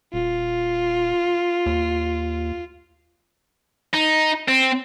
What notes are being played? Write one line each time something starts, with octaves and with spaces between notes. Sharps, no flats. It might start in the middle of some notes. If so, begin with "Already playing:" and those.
D#1 F4
D#2
D#4
C4